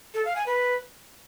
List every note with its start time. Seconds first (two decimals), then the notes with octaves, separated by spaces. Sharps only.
0.14 A4
0.25 F5
0.36 G#5
0.46 B4